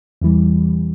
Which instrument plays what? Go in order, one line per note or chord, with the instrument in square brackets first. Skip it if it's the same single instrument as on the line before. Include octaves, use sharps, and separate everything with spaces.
[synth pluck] E2 C3 E3 G3